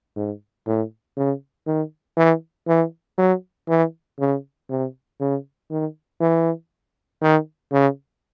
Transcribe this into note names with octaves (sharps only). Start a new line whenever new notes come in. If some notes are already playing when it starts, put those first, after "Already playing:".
G#2
A2
C#3
D#3
E3
E3
F#3
E3
C#3
C3
C#3
D#3
E3
D#3
C#3